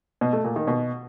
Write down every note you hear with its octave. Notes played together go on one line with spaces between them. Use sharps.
B2
A3
A#2
D#3
B2